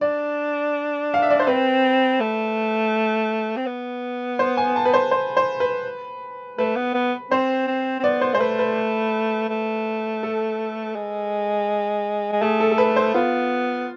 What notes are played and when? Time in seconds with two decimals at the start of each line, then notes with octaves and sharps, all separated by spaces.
0.01 D4 D5
1.14 F5
1.22 E5
1.31 D5
1.40 C5
1.47 C4 B4
2.20 A3
3.56 C4
3.66 B3
4.39 C5
4.57 G#5
4.76 A5
4.85 B4
4.94 C5
5.11 C5
5.37 C5
5.60 B4
6.58 A3 B4
6.76 B3
6.94 B3
7.31 C4 C5
7.67 C4
8.00 C4
8.04 B3 D5
8.21 C5
8.34 G#3 C5
8.40 A3 B4
8.59 B4
9.49 A3
10.23 A4
10.95 G#3
12.32 G#3
12.42 A3 G#4
12.60 A4
12.72 A4
12.78 B4
12.96 C5
13.14 B3 F4